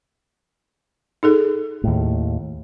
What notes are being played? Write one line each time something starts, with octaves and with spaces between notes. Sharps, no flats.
D#4 G#4 A4
D#2 A2